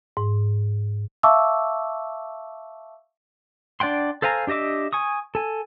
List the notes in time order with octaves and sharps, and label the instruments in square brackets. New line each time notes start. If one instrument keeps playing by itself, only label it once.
[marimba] G#2
[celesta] E5 F5 A5 C#6 D6 E6
[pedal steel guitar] D4 D5 F#5 G5 C6
A4 C5 F5 G#5 A#5
D4 G4 D#5 E5 D6
G#5 C#6 D#6
A4 G#5